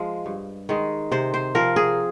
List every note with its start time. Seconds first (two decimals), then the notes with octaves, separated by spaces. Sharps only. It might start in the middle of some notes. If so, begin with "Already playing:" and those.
Already playing: F3 G#3
0.26 G2
0.69 D#3 G#3
1.11 C3 C5
1.34 C5
1.55 F3 C4 A#4
1.76 G#4